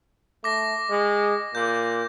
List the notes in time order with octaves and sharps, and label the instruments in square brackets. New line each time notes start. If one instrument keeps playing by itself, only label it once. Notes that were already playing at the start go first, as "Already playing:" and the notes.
[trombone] A3 [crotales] D6 A#6
[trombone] G#3
[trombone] A#2 [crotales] G6